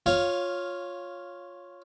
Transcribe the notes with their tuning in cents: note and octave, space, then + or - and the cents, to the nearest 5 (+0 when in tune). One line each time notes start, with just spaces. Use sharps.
F4 +15 C#5 +0 F5 +0